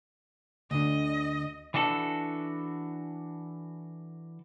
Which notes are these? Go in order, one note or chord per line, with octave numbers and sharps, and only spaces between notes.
D2 D3 D#5
E3 D4 F#4 A4